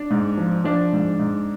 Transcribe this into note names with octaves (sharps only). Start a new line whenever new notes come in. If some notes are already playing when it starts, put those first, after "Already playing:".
Already playing: D4
G#2
F3
F3 D4
G#2
G#2